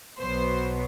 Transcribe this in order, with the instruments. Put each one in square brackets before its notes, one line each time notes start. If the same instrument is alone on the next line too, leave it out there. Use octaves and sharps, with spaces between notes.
[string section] B1 B2 F#3 B3 C5